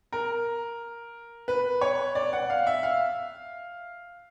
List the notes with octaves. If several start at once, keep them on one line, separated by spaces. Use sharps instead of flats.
A#4
B4
C#5
D5
F#5
F5
E5
F5